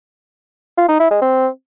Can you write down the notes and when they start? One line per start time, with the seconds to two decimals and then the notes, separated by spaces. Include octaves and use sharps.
0.77 F4
0.89 D#4
1.00 E4
1.11 G#3
1.22 C4